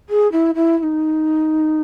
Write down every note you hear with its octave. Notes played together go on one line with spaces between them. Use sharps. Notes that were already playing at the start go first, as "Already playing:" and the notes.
G#4
E4
E4
E4
D#4